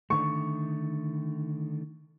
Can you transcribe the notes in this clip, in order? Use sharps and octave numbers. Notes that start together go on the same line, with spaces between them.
D3 D#3 A3 C#6